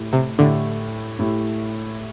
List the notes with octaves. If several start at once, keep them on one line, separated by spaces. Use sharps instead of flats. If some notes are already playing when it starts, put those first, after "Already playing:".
Already playing: A2 A3 E4 G4
C3
A2 D3 A3 E4 G4
A2 A3 E4 G4